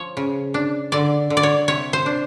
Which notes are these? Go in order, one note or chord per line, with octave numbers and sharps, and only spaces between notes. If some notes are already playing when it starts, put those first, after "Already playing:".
Already playing: F3 C#5
C#3
D4
D3 D5
D3
D5
C#5
C3 C#5
C5
D4